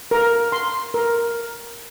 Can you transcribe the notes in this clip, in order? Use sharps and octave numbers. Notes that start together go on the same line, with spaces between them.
A#4
C6
A#4